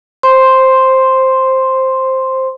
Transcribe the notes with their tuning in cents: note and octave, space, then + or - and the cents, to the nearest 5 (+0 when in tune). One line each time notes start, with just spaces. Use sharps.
C5 +5 C6 +0